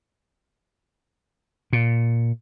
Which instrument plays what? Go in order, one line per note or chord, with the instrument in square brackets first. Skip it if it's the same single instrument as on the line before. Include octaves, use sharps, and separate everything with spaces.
[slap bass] A#2